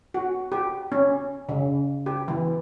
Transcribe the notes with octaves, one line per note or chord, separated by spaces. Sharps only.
F#4
G4
C#4
C#3
G4
E3